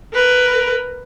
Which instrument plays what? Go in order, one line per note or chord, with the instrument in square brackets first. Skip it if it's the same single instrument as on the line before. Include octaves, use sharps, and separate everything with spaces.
[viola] A#4 B4